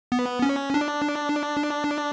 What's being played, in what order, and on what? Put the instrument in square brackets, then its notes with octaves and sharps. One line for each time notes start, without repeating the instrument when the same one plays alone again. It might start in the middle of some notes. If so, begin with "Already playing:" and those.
[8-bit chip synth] B3
C#4
D4